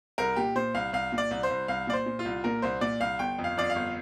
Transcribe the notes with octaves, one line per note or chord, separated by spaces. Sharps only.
C2 A#4
A#2 G4
A#2 C5
C2 F5
C2 F5
A#2
D5
C2
C5
C2
C2 F5
A#2 D5
C5
A#2
F4
C2
A#2 A#4
C2 C5
A#2 D5
C2 F5
G1 G5
F2
F5
F2 D5
F5
G1